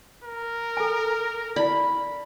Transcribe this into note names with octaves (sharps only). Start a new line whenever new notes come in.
A#4
A4 G#5
E4 D5 B5